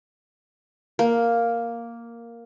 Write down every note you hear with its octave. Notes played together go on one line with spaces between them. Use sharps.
A#3